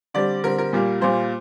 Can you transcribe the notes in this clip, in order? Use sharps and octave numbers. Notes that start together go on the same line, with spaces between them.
D3 G3 C4 D5
D3 G3 C4 A#4
A#4
A#2 G3 A#3
A#2 G3 A#3 C5